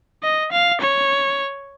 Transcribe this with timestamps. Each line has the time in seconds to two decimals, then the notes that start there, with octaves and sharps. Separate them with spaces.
0.23 D#5
0.52 F5
0.81 C#5